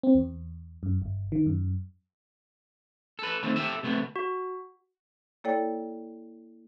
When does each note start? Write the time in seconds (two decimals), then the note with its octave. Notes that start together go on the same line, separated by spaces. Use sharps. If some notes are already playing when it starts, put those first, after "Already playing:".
0.03 C4
0.15 E2
0.83 F#2
1.02 G1
1.32 D#3
1.46 F#2
3.19 A4 B4
3.43 D#3 A3 C4
3.56 G4 A4 E5
3.83 C3 A3 B3
4.16 F#4
5.44 A#3 E4 A4 C#5 D5 G5